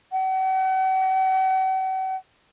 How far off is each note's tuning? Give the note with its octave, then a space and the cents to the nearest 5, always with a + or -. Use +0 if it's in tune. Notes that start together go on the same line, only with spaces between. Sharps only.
F#5 +40